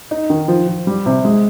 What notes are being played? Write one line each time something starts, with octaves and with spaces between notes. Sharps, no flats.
D#4
D#3
F3
F3
G3
C3
G#3